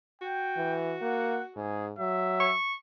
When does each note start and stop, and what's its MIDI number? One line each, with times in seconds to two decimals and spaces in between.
0.22 1.64 66
0.22 0.76 79
0.57 0.95 52
1.02 1.40 58
1.02 1.45 78
1.56 1.93 44
1.56 1.87 68
1.99 2.54 54
1.99 2.54 76
2.40 2.74 85